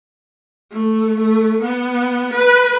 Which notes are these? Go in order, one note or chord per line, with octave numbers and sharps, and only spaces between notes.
A3
A3
B3
B4